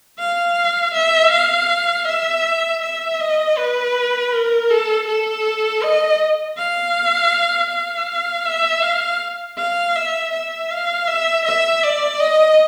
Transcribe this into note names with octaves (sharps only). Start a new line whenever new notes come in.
F5
E5
F5
E5
E5
D#5
B4
A#4
A4
A4
D#5
F5
F5
E5
F5
F5
E5
E5
F5
E5
E5
D5
D#5